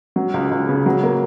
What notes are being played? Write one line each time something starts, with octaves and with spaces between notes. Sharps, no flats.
F#3
C#2
C#2
C#3
F#3
A#3